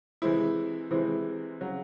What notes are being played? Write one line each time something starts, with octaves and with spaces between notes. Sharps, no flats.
C3 E3 G#3 C4 E4
C3 E3 G#3 C4 E4
C#3 F#3